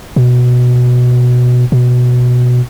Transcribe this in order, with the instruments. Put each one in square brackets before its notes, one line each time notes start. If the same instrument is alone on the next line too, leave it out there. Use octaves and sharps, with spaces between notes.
[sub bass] B2
B2